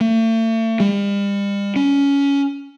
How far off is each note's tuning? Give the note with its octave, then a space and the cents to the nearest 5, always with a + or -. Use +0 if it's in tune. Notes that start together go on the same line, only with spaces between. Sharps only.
A3 +40
G3 +40
C#4 +15